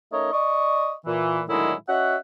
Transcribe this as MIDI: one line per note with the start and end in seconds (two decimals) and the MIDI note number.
0.12 0.28 57
0.12 0.28 61
0.12 0.28 63
0.12 0.28 70
0.12 0.28 73
0.12 0.28 75
0.32 0.92 74
0.32 0.92 75
0.32 0.92 85
1.06 1.41 46
1.06 1.41 52
1.49 1.74 45
1.49 1.74 50
1.49 1.74 51
1.49 1.74 54
1.49 1.74 56
1.49 1.74 64
1.88 2.17 61
1.88 2.17 66
1.88 2.17 75
1.88 2.17 76
1.88 2.17 78